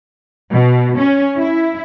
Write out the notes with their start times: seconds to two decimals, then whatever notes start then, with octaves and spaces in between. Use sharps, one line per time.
0.51 B2
0.98 C#4
1.38 E4